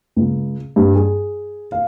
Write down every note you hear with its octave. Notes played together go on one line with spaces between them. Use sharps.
C#2
G2
G#4
F5